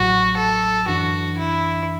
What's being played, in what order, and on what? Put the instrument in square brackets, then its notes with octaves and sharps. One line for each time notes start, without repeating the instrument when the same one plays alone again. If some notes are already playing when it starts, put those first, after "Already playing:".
Already playing: [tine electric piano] A1 A2 F#3 [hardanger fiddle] F#4
[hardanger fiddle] A4
[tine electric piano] F#2 E3 D4 [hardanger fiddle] F#4
[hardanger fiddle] E4